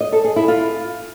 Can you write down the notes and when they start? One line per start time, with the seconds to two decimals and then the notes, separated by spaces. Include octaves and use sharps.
0.01 D#5
0.12 A4
0.24 G#4
0.36 E4
0.48 F4